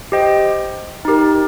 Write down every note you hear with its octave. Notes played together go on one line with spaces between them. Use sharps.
G4 C5 D#5 G5
D#4 G4 A#4